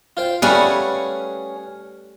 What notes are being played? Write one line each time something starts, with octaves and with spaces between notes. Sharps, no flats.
F4 C5 G5
G3 A3 C#4 G#4 B4 F5 F#5